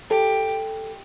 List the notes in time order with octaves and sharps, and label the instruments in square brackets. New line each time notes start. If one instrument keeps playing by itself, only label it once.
[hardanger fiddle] G4 [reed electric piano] A4